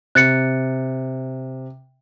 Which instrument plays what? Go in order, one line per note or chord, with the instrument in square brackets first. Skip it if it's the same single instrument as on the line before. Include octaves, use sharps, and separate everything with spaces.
[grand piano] C3 [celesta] F#6 A6 C#7